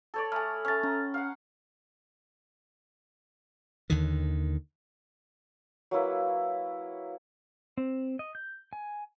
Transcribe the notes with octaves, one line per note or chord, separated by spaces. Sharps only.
A4 C#5 D5
A3 G#5 B5 D#6 F6
A3 C#4 F6 A6
C#4 A#5
F5 F#5
D#2 D3 D#3
F#3 A#3 E4 B4
C4
D#5
G6
G#5